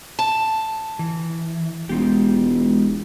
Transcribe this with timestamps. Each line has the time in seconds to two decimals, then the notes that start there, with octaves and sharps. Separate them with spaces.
0.19 A5
0.99 E3
1.89 E1 G#3 F4 G4